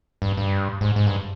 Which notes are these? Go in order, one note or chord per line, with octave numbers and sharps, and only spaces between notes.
G2
G2
G#2
G#2
G2